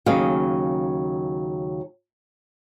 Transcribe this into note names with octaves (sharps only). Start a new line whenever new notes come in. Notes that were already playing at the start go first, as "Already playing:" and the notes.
D#2 C#3 F#3 G#4 D#5 F5